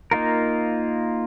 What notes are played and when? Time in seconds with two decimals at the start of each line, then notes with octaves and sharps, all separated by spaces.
0.11 A#3 D#4 F4 A#4